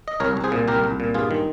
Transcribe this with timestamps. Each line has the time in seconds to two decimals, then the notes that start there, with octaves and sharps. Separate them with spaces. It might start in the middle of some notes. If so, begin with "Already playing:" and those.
0.08 D#5
0.20 C2 A#4 C#5
0.37 C2
0.44 G#4 C5
0.52 A#2
0.68 C2 G4 A#4
0.84 C2
1.00 A#2
1.14 G2 F4 G#4
1.31 D#3